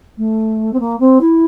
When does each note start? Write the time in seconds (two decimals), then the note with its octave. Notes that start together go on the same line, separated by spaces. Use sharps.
0.18 A3
0.73 C4
0.80 A#3
1.00 C4
1.21 E4